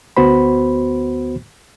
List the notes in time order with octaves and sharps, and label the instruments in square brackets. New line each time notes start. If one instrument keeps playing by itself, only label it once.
[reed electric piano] D2 B3 F#4 C5 B5